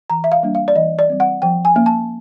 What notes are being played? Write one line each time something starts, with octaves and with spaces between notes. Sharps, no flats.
E3 A#5
E5
F5
G3 A#3 D4
F5
D5
E3 D#5
D5
G3 C4
F#5
F3 G5
G#5
A#3 C#4
A5